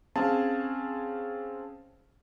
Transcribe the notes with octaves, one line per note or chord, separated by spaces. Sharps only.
C4 C#4 G#4 F5 A5